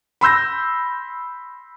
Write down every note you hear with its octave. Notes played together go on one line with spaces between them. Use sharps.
B5 C6 E6 G6 A#6